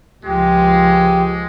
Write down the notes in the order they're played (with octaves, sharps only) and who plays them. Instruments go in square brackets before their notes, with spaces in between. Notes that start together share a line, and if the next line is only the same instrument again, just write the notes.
[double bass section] C#2 F3 [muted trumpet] G#3 [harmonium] G4